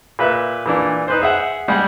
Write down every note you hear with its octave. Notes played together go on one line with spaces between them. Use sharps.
A#2 B4 E5
A#2 E3 D4
D#4 B4 C5
G#4 E5 F#5
G3 G#3 F#5